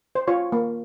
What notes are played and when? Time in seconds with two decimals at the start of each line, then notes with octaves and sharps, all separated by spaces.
0.15 C5
0.28 F4 C#5
0.52 A#3